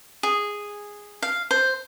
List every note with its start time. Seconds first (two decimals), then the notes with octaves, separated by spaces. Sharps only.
0.23 G#4
1.22 F5
1.51 C5